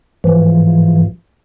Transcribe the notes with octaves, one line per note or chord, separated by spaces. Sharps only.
G#2 E3 F3